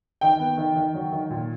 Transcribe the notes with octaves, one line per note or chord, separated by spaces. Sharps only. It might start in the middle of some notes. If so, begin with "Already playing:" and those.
D#3 G5
B3
D#3
D#3
F#3
D#3
A#2